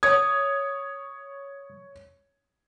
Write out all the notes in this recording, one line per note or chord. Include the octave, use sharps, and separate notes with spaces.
C#5 D#6 G#6